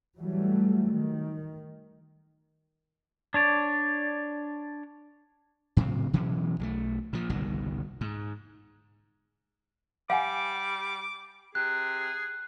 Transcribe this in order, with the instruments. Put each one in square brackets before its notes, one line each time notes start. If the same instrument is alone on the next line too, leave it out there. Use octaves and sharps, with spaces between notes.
[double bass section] E3 F#3 G3 A3
D#3
[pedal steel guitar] D4 C#5 D5
[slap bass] A2 C#3 F#3 C4
B2 E3 F#3 C#4
B1 F3 A3
A#2 F3
G1 C2 B2 D#3
G#2
[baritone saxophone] G3 [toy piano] F5 F#5 G#5 [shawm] D6
[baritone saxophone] C3 [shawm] G#4 [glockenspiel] F#6